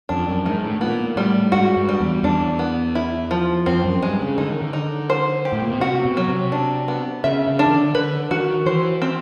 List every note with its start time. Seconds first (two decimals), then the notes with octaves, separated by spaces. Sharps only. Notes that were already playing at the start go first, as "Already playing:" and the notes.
0.09 F2 D4
0.27 F#2
0.45 G#2 D#3
0.63 A2
0.81 A#2 B3
1.16 A2 G3
1.52 G#2 F#4
1.76 G2
1.89 G3
2.01 E2
2.23 E2 D4
2.59 B3
2.95 E4
3.31 F3
3.66 F2 C4
3.84 F#2
4.02 G2 G#3
4.21 C#3
4.38 D3 D#4
4.51 D#3
4.62 D3
4.73 D#4
5.10 C5
5.45 G4
5.53 A2
5.62 A#2
5.71 B2
5.80 C3 F#4
6.05 B2
6.17 F#3
6.28 C3
6.52 D4
6.88 B3
7.24 C#3 E5
7.47 C#3
7.59 D4
7.67 D#3
7.72 D3
7.95 D3 B4
8.31 D#3 F#4
8.66 E3 C5
9.02 C4